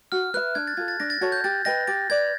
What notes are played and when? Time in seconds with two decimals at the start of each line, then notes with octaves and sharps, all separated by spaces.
0.12 F#4 F6
0.34 B4 E5 F#6
0.55 D4 G#6
0.67 A6
0.77 F4 A4 G#6
0.88 A6
1.00 D4 A#6
1.10 A6
1.21 F#4 A4 C#5 G#6
1.32 G6
1.44 G4 A6
1.65 B4 D#5 G5 A#6
1.88 G4 A6
2.10 B4 D5 G#6